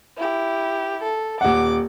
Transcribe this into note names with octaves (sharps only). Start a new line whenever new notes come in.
E4 G4
A4
D#1 F#5 D6